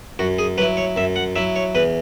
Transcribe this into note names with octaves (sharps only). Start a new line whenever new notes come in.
F#2 F#4
G#4
F#3 E4 B4
C#5
F#2 E5
F#5
F#3 E4 E5
C#5
E2 B4